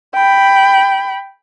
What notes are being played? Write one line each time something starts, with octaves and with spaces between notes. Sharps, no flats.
G5 B5